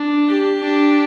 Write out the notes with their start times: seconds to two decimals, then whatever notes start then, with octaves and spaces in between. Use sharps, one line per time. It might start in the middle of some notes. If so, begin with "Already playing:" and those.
Already playing: D4
0.28 G4
0.63 D4